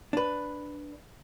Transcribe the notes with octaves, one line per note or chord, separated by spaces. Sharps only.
D4 B4